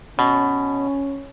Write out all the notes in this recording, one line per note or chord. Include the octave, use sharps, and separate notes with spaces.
B2 C#4